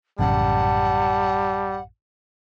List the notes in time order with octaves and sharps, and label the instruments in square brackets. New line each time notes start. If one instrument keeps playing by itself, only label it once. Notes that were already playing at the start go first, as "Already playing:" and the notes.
[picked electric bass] A1 F#2 C#3 [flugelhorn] G3 [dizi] F#5 [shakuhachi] A5